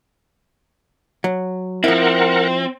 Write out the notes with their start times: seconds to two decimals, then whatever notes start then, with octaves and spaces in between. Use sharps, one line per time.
1.24 F#3
1.84 F3 C4 E4 A#4 F#5